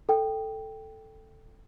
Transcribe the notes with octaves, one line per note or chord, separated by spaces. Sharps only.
A4 G5